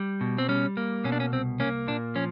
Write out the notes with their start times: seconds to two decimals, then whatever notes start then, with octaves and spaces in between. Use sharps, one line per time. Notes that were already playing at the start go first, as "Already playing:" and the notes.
Already playing: G3
0.21 B2
0.38 C4
0.49 G3 C#4
0.77 A#3
1.04 B2 C#4
1.12 D4
1.20 C#4
1.32 C2 C4
1.60 A#3 C#4
1.87 A#2 D4
2.15 F3 C#4